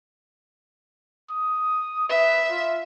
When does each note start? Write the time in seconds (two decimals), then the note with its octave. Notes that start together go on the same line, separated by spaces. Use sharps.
1.30 D#6
2.09 B4 E5
2.50 F4